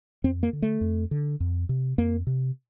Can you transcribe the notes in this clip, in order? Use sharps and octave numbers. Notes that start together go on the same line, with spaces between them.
F2 C4
A#3
D3
A3
F2
D3
F2
C3
F2 A#3
C3